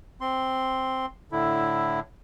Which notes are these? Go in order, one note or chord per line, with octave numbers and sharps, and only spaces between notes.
C4 C6
A2 D3 E4